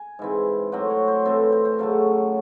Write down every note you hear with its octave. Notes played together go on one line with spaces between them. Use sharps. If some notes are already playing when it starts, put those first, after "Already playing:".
Already playing: G#5
G#2 E3 C4
A2 F#3 C4 F#5
C#5
C5
A2 E3 C4 A4
C5
C5
C#3 F#3 A3 A4